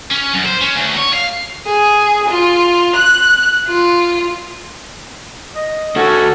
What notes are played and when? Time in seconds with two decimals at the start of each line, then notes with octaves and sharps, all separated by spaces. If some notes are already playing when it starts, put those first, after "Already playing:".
0.11 C#4
0.34 F#2
0.45 C5
0.61 C#4
0.76 D2
0.97 C#5
1.13 F5
1.66 G#4
2.28 F4
2.96 F#6
3.67 F4
5.55 D#5
5.96 D2 C#4 F#4 A4